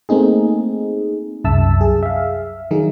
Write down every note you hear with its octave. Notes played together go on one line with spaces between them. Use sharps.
A3 A#3 C4 D#4 G#4
C2 F#2 E5 A5 E6
G#4
E5 F5
D#3 F#3 D#4 G#4